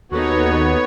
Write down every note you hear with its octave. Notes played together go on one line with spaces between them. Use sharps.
D#2 B3 D#4 F#4 A4 B4 C#5